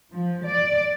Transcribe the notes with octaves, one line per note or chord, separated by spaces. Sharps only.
F3
D5